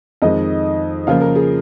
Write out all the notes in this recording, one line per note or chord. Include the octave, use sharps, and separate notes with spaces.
F2 D#3 G#3 D#4 D#5
C#3 F3 A#3 F4 F5
A#4
G#4